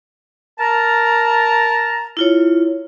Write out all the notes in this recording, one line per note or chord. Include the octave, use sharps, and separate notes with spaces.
A#4 A5 A#5
E4 F4 C#5